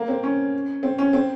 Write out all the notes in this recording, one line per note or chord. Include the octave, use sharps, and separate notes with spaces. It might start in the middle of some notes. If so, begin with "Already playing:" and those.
Already playing: A#3
C4
C#4
C4
C#4
C4